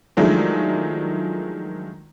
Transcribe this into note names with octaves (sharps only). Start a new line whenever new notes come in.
D#3 F3 F#3 G#3 A3 D4